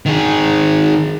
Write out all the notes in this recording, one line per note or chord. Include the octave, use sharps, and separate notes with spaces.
D#3 G#4